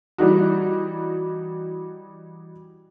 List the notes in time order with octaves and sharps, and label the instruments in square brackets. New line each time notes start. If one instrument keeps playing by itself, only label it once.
[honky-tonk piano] E3 G3 D#4 F#4